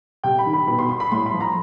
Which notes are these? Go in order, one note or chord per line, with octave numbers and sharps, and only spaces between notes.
C3 G5
B5
D#3
B5
B2 B5
C6
C6
B5
A2 C6
B5
F3
A#5